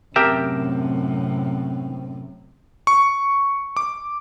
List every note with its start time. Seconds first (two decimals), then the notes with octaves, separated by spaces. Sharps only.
0.16 F#2 A2 C3 C4 G4 A#4 E5 A5
2.87 C#6
3.77 D6